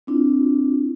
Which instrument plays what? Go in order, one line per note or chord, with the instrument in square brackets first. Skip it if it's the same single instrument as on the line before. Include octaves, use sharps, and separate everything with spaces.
[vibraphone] C4 D4 E4 F4